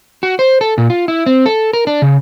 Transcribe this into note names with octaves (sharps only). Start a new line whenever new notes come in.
F#4
C5
A4
A#2
F4
E4
C4
A4
A#4
D4
C#3